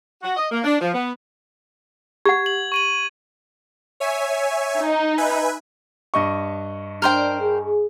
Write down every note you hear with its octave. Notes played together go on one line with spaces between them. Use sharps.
F#4
D#5
A#3
D4
F3
B3
G4 F#5 G#6
F#7
C#6 D#7 F#7
C#5 E5 G#5
D#4
B4 E5 G#5
G2 D#5 C#6
D4 A#4 C5 G5
G#4